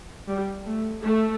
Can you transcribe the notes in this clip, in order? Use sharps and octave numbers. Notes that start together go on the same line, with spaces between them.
G3
A3
A3